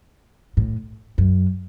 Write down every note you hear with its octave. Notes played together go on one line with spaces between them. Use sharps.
A2
F#2